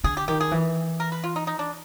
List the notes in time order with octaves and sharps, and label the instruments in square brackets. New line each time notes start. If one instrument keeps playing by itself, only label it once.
[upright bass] D3 [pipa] G#4
[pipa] G4
[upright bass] D#3 [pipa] G4
[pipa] G#4
[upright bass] E3
[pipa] A#4
B4
F4
D#4
D#4
D4